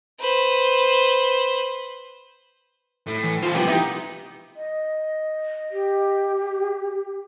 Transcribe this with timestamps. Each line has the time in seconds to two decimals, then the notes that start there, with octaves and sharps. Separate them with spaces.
0.20 B4 C5
3.07 A2
3.24 E3
3.43 E3 E4 F4 C5
3.55 C2 F3 A#3 G4 B4 F#5
3.68 D#4 E4 G4
4.56 D#5
5.71 G4